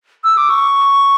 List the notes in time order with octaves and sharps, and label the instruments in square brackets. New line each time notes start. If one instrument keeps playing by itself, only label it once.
[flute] E6
D6
C#6